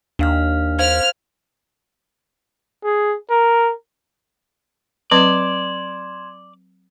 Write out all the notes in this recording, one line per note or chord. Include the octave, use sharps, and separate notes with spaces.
D#2 D4 F5 F6
C5 F5 F6 G#6
G#4
A#4
F#3 C4 B4 D5 C6 G#6 E7